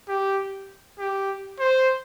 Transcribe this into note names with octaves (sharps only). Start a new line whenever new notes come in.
G4
G4
C5